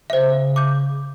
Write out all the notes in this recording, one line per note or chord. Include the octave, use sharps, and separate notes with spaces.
C#3 C5 E5
D6 G6